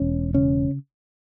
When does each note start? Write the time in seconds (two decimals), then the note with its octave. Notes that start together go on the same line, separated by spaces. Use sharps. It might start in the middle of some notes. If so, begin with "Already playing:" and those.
Already playing: E1 C#4
0.34 C#3 C#4